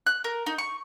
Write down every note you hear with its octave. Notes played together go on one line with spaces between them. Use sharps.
F#6
A#4
D#4
C#6